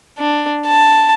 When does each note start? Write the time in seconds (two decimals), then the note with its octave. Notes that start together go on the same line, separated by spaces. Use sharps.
0.18 D4
0.66 A5